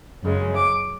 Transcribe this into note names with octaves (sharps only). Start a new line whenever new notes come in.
F#2 C#3 G#3
D6